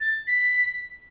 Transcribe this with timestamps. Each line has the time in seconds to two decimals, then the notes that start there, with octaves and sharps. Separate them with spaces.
0.01 A6
0.27 B6